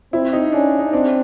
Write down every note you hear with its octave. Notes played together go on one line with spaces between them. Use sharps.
C4 E4
D#4
C#4 D4
D#4
C4 D4